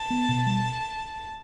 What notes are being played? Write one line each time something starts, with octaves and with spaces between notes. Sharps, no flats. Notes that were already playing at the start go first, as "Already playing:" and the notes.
Already playing: A5
B3
B2
G3